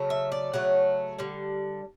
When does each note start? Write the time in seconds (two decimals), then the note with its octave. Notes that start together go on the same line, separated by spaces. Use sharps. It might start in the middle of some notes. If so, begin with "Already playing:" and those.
Already playing: C#3 F#3 A3
0.10 E5
0.32 D5
0.53 C#3 F#3 A3 F#5
1.18 D3 G3